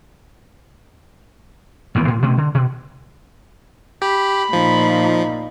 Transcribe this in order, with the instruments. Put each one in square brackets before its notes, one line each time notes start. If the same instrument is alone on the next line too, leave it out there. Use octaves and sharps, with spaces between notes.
[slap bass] G#1 D#2 E3 B3
A2
B2 A3 C4 C#4
D3
B2
[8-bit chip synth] G4 [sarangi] B5
[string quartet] A#2 [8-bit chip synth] F3 [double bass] D#4